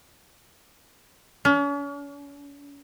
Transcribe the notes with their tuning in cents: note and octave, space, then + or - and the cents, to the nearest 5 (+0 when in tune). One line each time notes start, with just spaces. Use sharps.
C#4 +40